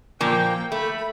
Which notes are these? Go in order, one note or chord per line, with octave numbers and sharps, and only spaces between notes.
A#2 F3 A#3 G5
A3 B5